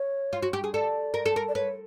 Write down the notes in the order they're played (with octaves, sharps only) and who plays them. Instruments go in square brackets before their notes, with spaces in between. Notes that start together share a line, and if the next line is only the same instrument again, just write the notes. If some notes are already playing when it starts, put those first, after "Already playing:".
Already playing: [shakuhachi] C#5
[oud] F4
F#4
G4
G#4
[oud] A4 [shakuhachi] D5
[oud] A#4
A4
A#4
[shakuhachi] D5
[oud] B4 [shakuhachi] C#5